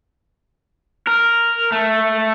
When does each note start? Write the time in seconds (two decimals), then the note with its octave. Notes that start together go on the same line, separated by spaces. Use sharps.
1.07 A#4
1.72 A3